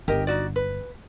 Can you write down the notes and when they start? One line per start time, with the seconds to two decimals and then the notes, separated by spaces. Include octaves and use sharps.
0.08 G1 G4 A#4 D#5
0.27 D#4 F#4 D5
0.56 B4